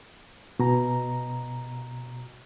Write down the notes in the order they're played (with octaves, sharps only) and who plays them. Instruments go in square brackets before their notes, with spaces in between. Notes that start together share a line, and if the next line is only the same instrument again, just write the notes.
[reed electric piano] B2 A#5